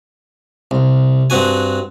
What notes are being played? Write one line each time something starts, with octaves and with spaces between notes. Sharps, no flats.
C2
G2 C4 F#4 G#5